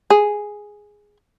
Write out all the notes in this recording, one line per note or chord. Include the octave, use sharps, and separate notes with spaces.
G#4